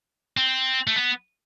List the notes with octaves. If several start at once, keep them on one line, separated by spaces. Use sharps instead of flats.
C4
A3
B3